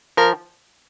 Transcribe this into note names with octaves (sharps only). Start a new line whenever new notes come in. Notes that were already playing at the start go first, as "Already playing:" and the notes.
F3 A#4